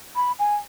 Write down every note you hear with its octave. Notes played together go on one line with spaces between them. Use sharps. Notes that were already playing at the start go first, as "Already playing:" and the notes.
B5
G#5